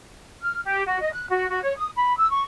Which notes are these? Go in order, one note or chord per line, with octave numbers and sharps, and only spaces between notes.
F6
G4
F#4
D#5
F#6
F#4
F#4
C#5
D#6
B5
E6
C#6